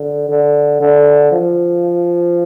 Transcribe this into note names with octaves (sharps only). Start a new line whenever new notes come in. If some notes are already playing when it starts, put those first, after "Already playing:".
Already playing: D3
D3
D3
F3